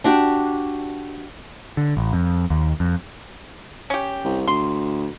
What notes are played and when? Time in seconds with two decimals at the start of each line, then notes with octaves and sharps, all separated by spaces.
0.04 D4 F#4 G4
1.77 D3
1.97 A1
2.13 F2
2.50 D#2
2.80 F2
3.90 C#4 G4
4.24 C2
4.48 D2 C6